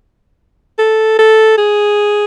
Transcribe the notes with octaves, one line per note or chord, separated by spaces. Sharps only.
A4
A4
G#4